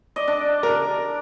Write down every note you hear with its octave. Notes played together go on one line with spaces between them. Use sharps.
D5 D#5
D4
A#4